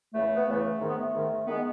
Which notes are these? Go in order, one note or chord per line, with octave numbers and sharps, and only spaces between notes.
E2 C#3 E3 A3
B3
E2 C#3 E3 A3
G#2 D#3
B3
A3
G#2 D#3
D#3 G#3 B3